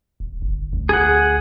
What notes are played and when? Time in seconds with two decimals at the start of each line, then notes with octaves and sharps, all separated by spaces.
0.20 D1
0.42 G1
0.73 D2
0.89 G#4 F#5